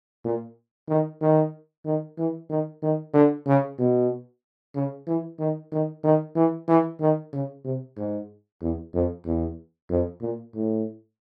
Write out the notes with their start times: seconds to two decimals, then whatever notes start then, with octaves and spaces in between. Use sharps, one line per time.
0.24 A#2
0.89 D#3
1.21 D#3
1.85 D#3
2.18 E3
2.50 D#3
2.82 D#3
3.14 D3
3.47 C#3
3.79 B2
4.75 C#3
5.07 E3
5.39 D#3
5.72 D#3
6.04 D#3
6.36 E3
6.68 E3
7.01 D#3
7.33 C#3
7.65 C3
7.98 G#2
8.62 E2
8.94 F2
9.26 E2
9.90 F2
10.22 A#2
10.55 A2